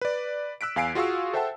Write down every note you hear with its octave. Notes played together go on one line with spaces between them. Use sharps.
B4 D5
E6 F#6 B6 D7
E2 F5 G#5 C7 D7
F4 F#4 G#4 F5 C#6 E6
A4 C5 E5 F#5 G5 A5